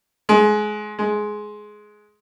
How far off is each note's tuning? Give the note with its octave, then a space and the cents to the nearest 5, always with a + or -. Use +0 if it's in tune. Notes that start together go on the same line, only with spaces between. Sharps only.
G#3 +20
G#3 +10